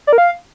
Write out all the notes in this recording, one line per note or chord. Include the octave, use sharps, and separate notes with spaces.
D5
A#4
F5